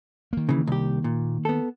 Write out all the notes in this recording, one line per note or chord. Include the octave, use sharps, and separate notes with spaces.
D#3 A#3
C#3 E3
C2 G4
A#2
B3 A4